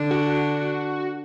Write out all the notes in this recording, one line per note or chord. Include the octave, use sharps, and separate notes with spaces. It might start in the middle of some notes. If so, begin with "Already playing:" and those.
Already playing: D3 D4
F#4